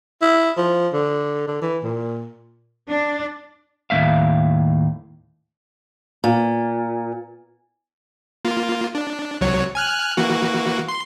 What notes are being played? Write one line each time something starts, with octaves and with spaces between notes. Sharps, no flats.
E4
F3
D3
D3
E3
A#2
D4
D#2 A2 A3 E5 F5
A#2
A#3 F4
D4
C2 F#3 C#5
G#5 F6 F#6
E3 A#3 F#4
C6